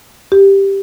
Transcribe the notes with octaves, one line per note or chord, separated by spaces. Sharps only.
G4